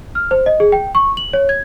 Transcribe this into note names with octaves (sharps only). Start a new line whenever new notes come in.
F6
C5
D#5
G#4
G5
C#6
F#7
C#5
G#6